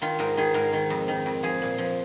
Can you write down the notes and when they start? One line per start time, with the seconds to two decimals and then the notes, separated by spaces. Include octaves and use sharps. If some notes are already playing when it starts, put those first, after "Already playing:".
0.02 D#3 F4
0.19 G#2 A#4
0.37 D#3 G#4
0.54 G#2 A#4
0.73 D#3
0.90 F2
1.08 D#3
1.26 F2
1.43 F3 G#4
1.62 A#2
1.78 F3